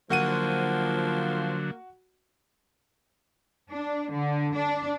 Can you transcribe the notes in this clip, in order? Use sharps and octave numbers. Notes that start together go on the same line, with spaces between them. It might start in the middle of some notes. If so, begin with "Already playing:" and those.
D3 F3 F#3 A#3 F#4 C5 F#5 D#7
D4
D3
D4